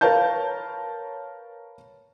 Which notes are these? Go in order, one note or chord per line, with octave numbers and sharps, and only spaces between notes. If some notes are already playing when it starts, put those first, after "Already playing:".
A#4 B4 C#5 F5 A5 G6